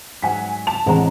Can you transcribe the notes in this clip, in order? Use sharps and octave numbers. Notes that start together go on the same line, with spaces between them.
G#2 F#3 F#5 G#5 B6
A5 F7
A1 E3 G#3 C4 D4 A#5